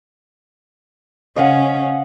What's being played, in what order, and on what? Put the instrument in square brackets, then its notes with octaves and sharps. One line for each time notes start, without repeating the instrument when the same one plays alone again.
[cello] C#3 C#4 [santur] D#5 F5 F#5